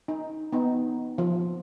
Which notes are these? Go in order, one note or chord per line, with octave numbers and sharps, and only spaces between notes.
D#4
B3 D#4
F3